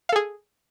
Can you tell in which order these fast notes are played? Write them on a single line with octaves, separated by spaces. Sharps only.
F5 A4 G#4